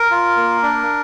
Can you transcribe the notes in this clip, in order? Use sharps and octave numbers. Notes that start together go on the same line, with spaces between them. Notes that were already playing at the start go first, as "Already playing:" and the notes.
Already playing: A#4
F4
A#3
D4